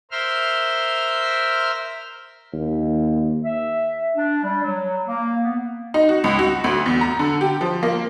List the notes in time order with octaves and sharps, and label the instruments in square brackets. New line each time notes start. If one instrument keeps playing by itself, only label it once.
[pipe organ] A#4 C5 E5 C6 F6
[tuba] D#2
[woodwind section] E5
D4
G3
F#3
A#3
B3
[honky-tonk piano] D#4
F#4
C#2
F#4
D2
E2
A#5
D3
G4
F3
A#3